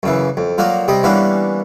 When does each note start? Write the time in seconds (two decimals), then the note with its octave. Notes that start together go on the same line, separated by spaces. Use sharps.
0.03 F#2 C#3 E3
0.37 F2
0.58 F3 F#3 A#3 D5
0.88 C3 G3 D#5
1.03 E3 G3 A#3 B3 C#4 D4